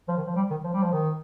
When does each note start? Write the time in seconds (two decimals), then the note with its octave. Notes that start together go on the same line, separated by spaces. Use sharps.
0.08 F3
0.17 D#3
0.27 F3
0.36 G3
0.50 D#3
0.64 F3
0.74 G3
0.82 F3
0.92 D#3